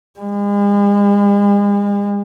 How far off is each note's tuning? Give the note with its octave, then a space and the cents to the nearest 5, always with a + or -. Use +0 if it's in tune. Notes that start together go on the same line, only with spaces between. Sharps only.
G#3 -40